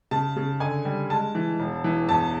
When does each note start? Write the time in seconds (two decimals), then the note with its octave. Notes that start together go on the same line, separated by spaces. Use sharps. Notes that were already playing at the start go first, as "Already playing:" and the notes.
0.11 C#3 A5
0.36 C#3
0.60 D3 G#5
0.85 G3
1.10 G#3 A5
1.35 E3
1.60 E1
1.84 E3
2.09 E2 A5